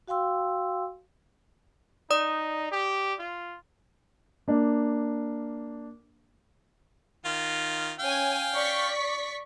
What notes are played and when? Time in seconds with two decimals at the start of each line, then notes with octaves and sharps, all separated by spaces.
0.08 F#4 F5 G5 C6 E6
2.11 D#4 D5 D#6
2.72 G4
3.19 F4
4.48 A#3 D4
7.25 D#3 F4
8.00 C#4 F5 G5 G#5
8.54 D5 C#6 B6